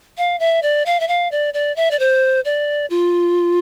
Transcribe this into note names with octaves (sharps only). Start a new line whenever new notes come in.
F5
E5
D5
F5
E5
F5
D5
D5
E5
D5
C5
D5
F4